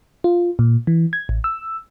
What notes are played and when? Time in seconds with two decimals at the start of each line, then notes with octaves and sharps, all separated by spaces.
0.24 F4
0.59 A#2
0.87 E3
1.13 G#6
1.29 A1
1.44 E6